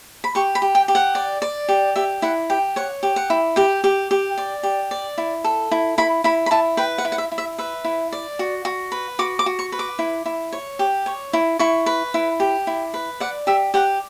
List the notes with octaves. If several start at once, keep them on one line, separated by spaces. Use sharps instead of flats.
B5
G4 C#6
B5
G4
G5
G4
F#5
D5
D5
G4
G4 E5
E4 F#5
G4 G5
C#5 F#5
G4
F#5
E4
G4 G5
G4
G4
D5
G4
D5
E4
A4
E4
E4 B5
E4 B5
B5
E4 A5
B4 G5
F#5
E4
F#5
E5
E4
E5
B4 E5
E4
D5
F#4
F#4
B4
F#4 D6
D6
F#4
C#6
B4
D6
E4
E4
C#5
G4
C#5
E4
E4 C#6
B4
E4
G4
E4
B4
D5 F#5
G4 E5
G4 F#5